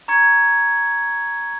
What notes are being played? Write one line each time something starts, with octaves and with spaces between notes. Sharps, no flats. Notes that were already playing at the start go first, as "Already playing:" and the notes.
A#5 C#6 G#6 C#7